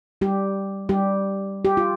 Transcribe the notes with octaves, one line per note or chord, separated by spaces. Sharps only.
G3 G4
G3 G4
G4
F4